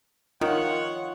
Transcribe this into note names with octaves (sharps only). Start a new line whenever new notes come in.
D#3 F4 C#5 F#5